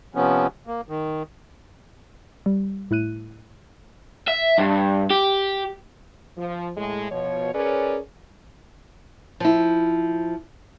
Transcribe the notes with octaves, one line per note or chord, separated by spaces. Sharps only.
C3 F3 B3 C#4
A#3
D#3
G3
A2 E4 F#6 D#7
E5
G2
G4
F3
A2 G#3
B2 F3 C#5
C#4 G#4 A#4 B4 C#5 D5
F3 E4